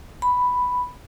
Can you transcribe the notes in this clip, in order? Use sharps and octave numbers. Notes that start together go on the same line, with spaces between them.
B5